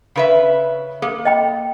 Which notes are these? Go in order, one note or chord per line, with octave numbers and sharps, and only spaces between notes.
C#3 B4 E5
A#3 A4
D#5 G5 B5